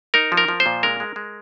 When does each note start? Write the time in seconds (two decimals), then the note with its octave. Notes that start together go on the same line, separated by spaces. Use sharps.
0.14 D#4 A#4
0.32 F3
0.37 A#4
0.49 F3
0.60 C5
0.66 A#2
0.83 G#3 A#4
1.00 G#3
1.16 G#3